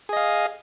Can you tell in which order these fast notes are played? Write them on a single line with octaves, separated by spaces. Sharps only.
G#4 D#5 F5